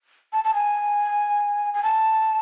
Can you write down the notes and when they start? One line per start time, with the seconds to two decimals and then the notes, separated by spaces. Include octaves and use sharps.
0.33 A5
0.44 A5
0.54 G#5
1.74 G#5
1.83 A5